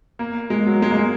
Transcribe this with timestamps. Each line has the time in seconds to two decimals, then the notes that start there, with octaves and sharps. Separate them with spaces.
0.19 A#3
0.50 G#3
0.66 F#3
0.82 G#3
0.91 A#3
0.97 G#3